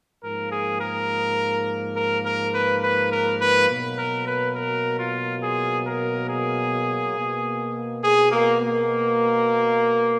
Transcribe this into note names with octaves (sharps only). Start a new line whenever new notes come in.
G#2 F3 A#3 A#4
G#4
A#4
A#4
A#4
B4
B4
A#4
B4
B2 F#3 A#3
A#4
B4
A#4
F4
G#4
A#4
G#4
B2 A#3
G#4
A#3
A#3